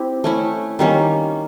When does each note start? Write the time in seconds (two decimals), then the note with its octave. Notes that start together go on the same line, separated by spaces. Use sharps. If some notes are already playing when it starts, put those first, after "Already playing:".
Already playing: C4 E4 G4
0.24 A3 C#4 E4
0.79 D#3 G3 A#3 C#4